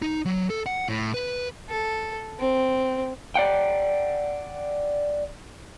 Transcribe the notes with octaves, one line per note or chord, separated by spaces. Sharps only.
D#4
F#3
A4
F#5
A2
B4
A4
C4
D5 F#5 G5